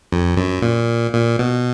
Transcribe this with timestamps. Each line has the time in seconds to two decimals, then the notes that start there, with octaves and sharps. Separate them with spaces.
0.12 F2
0.37 F#2
0.62 A#2
1.13 A#2
1.39 B2